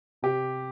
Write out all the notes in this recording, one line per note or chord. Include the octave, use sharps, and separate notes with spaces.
C3 G4